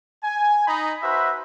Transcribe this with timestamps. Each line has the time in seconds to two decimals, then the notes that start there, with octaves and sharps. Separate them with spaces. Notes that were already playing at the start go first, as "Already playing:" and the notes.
0.24 G#5
0.67 D#4 B5
1.02 F#4 B4 C5 E5